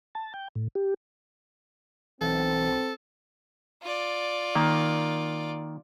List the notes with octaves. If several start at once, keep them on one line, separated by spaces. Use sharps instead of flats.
A5
G5
A2
G4
B1 E3 C4 A4
F4 D5
D#3 A#3